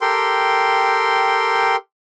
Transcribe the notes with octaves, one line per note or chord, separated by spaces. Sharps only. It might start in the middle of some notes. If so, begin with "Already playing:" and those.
G4 A4 A#4 G5 C6